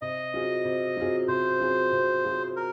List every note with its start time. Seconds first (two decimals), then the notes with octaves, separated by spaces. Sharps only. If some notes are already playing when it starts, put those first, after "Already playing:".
0.02 C3 D#5
0.33 F#3 C4 F4 G#4
0.65 C3
0.97 F#3 C4 F4 G#4
1.28 C3 C5
1.60 F#3 C4 F4 G#4
1.92 C3
2.24 F#3 C4 F4 G#4
2.56 A#4